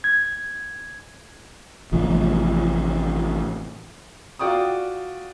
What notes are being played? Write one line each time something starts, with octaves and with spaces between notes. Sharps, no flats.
G#6
A1 A2 C3 F3
F4 F#4 D5 G5 D#6